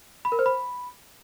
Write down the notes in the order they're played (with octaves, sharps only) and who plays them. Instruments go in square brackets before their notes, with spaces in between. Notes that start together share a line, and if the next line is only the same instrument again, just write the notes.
[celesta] B5
A#4
C5
B5